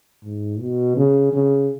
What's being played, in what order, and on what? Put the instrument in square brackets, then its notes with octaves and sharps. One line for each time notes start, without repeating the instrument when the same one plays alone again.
[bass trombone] G#2
B2
C#3
C#3